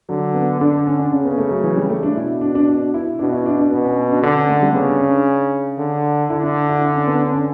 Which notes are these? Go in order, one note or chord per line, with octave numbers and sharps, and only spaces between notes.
D3 F#3
B3
D3 D4
D4
C#4
D4
C#3 C#4
B3
A3
F#3
E3
G3
A3
D4
B2 E4
D4
D4
D4
E4
B2 D4
E4
D4
D4
B2 B3
C#4
D4
D3 D4
C#4
A3
G3
C#3 B3
D4
C#4
D4
D3
D3 E4
D4
E4
D4
C#4
B3
C#4
C#4